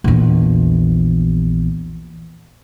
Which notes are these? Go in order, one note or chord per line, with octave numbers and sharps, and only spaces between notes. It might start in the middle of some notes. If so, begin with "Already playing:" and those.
A#1 E2